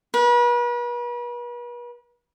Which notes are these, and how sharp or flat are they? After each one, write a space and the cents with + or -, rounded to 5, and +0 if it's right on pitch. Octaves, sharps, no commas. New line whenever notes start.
B4 -40